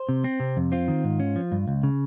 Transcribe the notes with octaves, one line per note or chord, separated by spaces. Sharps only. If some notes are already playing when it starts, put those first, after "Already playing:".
Already playing: C5
C3
C4
C3
F2
C4 F4
D#3
G#2
C#4
F3
G2
C#2
C#3